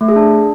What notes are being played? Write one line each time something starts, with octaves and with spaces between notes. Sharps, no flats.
A3
G#4
D4